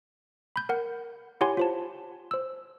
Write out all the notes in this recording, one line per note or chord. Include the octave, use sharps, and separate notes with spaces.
B5 G6
A#4 F#5
E4 G4 C#5 F#5 G#5 C6
F4 C5 A5
C5 E6